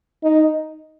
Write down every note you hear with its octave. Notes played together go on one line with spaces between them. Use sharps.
D#4